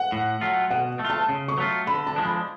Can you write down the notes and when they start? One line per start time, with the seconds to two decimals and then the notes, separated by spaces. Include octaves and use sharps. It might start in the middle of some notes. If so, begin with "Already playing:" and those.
Already playing: F#5
0.12 A2
0.41 F#3 A3 F4
0.71 B2 F#5
0.99 A3
1.05 F4
1.10 A5
1.29 C#3
1.48 C#6
1.58 F#3 A3 F4
1.87 D3 B5
2.07 A5
2.16 F3 G#3 D4
2.26 B5